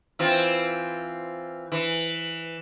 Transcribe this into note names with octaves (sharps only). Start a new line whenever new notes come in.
E3 C4 F4
E3